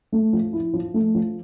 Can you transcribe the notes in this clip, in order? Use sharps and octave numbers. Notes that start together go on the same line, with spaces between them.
A3
F3
E4
F3
A3
F3